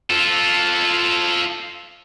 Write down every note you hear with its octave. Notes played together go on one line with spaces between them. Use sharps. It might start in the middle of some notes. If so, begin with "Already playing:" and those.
F4 A4